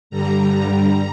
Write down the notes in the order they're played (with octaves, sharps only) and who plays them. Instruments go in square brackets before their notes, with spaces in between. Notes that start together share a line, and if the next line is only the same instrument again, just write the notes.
[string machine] G2 D3 G3 A#5